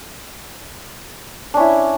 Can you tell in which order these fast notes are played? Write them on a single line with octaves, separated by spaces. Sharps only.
D4 C#4 E4